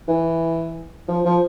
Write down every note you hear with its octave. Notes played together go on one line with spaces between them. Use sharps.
E3
F3
F3